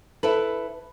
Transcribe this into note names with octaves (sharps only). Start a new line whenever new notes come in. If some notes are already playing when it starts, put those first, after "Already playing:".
E4 A4 B4